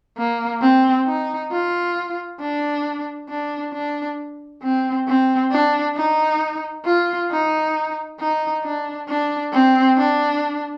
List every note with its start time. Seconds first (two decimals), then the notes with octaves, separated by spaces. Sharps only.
0.18 A#3
0.62 C4
1.07 D#4
1.51 F4
2.40 D4
3.30 D4
3.74 D4
4.63 C4
5.08 C4
5.52 D4
5.97 D#4
6.86 F4
7.31 D#4
8.20 D#4
8.64 D4
9.09 D4
9.53 C4
9.98 D4